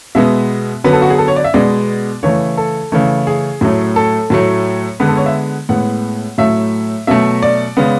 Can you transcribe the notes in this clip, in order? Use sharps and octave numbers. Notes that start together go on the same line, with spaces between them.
B2 G#3 B3 E5
D3 F#3 B3 B4
A4
F#4
G#4
A4
C#5
D5
E5
B2 G#3 B3 D5
C#3 E3 A3 C#5
A4
C#3 E3 A3
G#4
A2 F#3 A3
A4
A2 F#3 A3
D3 G#3 B3 B4
A4
C#5
E5
A2 G#3 B3 F#5
A2 F#3 A3 E5
B2 F#3 A3 E5
D5
C#3 G#3 B3